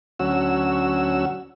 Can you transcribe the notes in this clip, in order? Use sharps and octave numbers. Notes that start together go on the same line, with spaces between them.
D2 F#3 C#4 F#4 E6